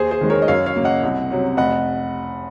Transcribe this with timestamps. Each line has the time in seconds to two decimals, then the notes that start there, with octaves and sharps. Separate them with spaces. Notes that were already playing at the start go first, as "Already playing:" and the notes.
Already playing: D#2 G#4 C5
0.11 G#4 C5
0.21 D#3 G#3
0.30 A#4 C#5
0.42 D#5
0.48 F#2 C#5 F5
0.66 C#5 F5
0.76 C#3 F#3 A#3
0.84 D#5 F#5
1.03 C2
1.30 C3 F#3 C#4
1.57 F1 D#5 F#5